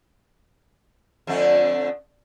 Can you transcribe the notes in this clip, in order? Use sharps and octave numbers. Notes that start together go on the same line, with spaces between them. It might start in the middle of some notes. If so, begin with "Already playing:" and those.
F2 D3 A3